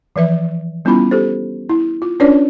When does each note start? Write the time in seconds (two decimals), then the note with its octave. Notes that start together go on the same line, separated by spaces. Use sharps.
0.16 E3 F3 B4 E5
0.85 G3 B3 C#4 E4 F4 B5
1.11 G4 A4 C5
1.69 E4
2.02 F4
2.20 C#4 D4 F4 B4 C#5 D5